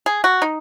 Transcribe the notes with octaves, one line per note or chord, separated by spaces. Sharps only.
G#4
F#4
D#4